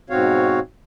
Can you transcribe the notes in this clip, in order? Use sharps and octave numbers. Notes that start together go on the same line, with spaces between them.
G#2 B2 C4 F#4 C#5 F5